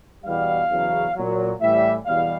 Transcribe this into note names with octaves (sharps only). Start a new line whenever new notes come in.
E2 B2 G3 F5
E2 C#3 F#3
A#2 F#3
A2 E3 G3 E5
E2 B2 G3 F5